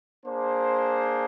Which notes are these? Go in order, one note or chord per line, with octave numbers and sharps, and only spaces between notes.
A#3 D4 G#4 C5